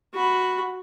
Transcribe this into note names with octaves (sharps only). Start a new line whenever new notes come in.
F#4 B5